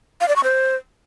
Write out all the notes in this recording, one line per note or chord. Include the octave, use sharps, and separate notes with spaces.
F5
D5
C#6
C5